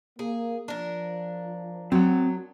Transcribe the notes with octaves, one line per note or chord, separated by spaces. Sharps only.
A#3 G#4
F3 D4 A#4
F#3 C4 F#5